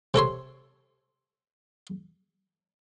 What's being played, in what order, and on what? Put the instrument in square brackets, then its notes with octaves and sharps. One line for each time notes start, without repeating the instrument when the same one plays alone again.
[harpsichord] C3 A4 C#5 C6